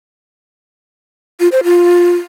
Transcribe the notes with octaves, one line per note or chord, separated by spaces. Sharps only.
F4
C5
F4